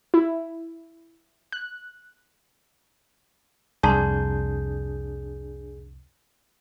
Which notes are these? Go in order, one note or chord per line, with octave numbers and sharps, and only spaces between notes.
E4
F#6
C2 F2 D4 G#4 A5 A#5 C6 G6